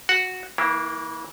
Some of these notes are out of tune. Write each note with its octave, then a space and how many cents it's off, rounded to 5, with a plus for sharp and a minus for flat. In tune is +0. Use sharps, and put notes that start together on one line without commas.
F#4 -5 F#5 +0
E3 -35 A#3 +0 E4 +25